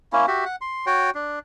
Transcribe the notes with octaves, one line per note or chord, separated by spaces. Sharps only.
A#3 C#4 E4
F#4 G4 E5
F#5
C6
F#4 C#5 G5
D4